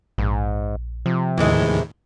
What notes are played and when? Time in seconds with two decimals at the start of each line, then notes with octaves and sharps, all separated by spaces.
0.18 A#1 G#2
1.06 C3 F3
1.37 D#2 A2 D#3 E3 G#3